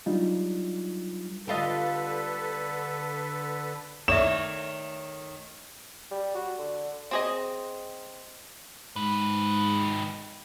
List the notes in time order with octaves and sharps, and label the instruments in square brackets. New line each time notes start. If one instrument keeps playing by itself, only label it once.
[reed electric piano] F#3 G3 D4 D#4 F4
[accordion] D3 A4 B4 [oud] G3 F4 D#5
[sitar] D#3 A3 C#5 [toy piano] A4 D5 E5 [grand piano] E7
[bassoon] G3
F#4
D3
[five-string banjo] C4 G#4 D#5
[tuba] G#2 [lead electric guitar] D#3 B4